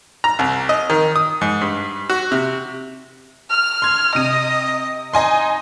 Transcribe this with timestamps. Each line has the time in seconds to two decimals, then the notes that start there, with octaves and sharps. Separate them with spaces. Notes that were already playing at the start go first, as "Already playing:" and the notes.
0.24 A#5
0.39 C2
0.69 D#5
0.90 D#3
1.16 D#6
1.41 G#2
1.61 G2
2.10 F#4
2.32 C3
3.50 F6
3.82 C6 G#6
4.15 C3 D#5 D#7
5.13 D#4 D#5 G#5 C6